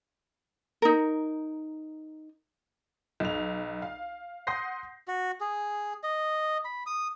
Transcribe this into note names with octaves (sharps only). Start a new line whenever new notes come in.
D#4 A#4
B1 F7
F5
F#5 C6 D#6 G6 A#6 C7
F#4
G#4
D#5
B5
D#6